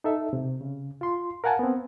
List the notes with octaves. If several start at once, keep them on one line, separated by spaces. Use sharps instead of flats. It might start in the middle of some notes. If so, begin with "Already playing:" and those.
D#4 A4 E5
C3
C#3
F4 C6
A#4 F5 F#5 G#5 A5
B3 C4